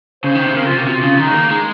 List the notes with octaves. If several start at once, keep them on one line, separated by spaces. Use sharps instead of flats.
C#3 C5
D#3
C3
C#3 A#4
F4
C3
F#4
C3 F4
C#3
D#3 D#4
G#3
A#3
G#3 D#4